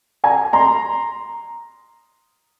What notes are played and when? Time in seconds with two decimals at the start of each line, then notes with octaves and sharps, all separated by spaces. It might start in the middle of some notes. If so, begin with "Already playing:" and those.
0.24 G#5 A#5
0.53 A#5 C6